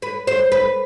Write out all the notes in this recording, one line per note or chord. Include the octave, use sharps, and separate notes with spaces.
B4
C5
B4